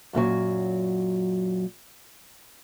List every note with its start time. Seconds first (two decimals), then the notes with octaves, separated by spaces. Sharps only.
0.13 F#2 A#2 E3 F#3